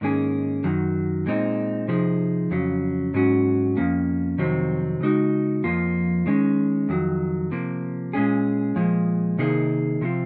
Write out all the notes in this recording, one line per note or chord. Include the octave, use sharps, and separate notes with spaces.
G#2 D#3 A#3 C#4 G#4
F#2 D#3 F#3
A#2 G#3 C4 D#4
C3 F3 D#4 G#4
F2 C#3 F#3 C#4
G#2 F#3 C#4 F#4
F2 D#3 A#3 C#4
F2 C3 D#3 F#3 C4
C#3 G#3 D#4 F#4
F2 C3 F3 A#3 F4
D#3 G#3 C#4
F2 D#3 F#3
C3 F3 A#3
A#2 G#3 C#4 G#4
A#2 F3 G#3
C3 D#3 A#3 D#4 G#4
C3 F3 C4 F4